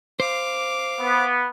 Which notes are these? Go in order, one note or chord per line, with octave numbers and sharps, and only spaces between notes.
C5 F5 D6
B3